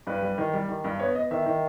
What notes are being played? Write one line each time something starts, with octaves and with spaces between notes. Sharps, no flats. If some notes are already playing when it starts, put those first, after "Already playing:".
G2 B4
G3
D#3
G3
D#3
G2
B3 C#5
B3 D#5
D#3 E5
D#3